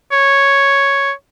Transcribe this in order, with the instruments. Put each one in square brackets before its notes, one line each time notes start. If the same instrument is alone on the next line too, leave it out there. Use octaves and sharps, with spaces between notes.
[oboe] C#5